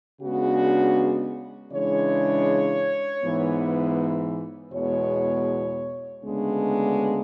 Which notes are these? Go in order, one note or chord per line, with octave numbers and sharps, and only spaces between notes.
C#3 G#3 B3 D4 F#4
C#3 E3 G#3 D4 C#5
G#2 E3 B3
E2 B2 G#3 C#5
D2 C#3 G#3 B3 D4